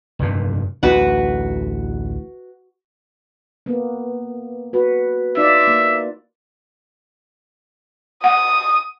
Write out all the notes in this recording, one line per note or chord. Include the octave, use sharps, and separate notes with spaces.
F1 G2 A#2
A1 D2 F#4 B4 F#5
A#3 B3
F#4 B4
D#4 F4 D5 E5
A#3
F#5 D#6